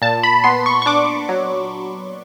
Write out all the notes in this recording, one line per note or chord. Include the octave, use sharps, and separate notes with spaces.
A#2 A5
B5
B3 C6
C#6
C#6
D4 D6
F#3